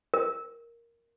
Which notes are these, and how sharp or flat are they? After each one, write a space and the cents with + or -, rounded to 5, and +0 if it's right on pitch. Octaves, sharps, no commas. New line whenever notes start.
A#4 +0